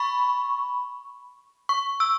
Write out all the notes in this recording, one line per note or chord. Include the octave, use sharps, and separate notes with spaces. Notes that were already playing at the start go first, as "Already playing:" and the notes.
Already playing: B5 C#6
C#6
E6